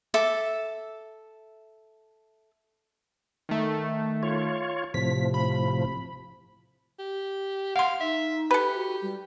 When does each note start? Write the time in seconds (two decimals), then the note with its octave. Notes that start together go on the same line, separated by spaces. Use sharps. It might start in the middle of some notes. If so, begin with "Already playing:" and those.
0.14 A4 E5 D6
3.49 D#3 A3
4.23 F4 C#5
4.94 A2 C3 F3 B6
5.34 B5
6.99 G4
7.76 F5 F#5 C6
8.01 D#4 E5
8.51 G4 A4 B4
8.75 F#4
9.02 G3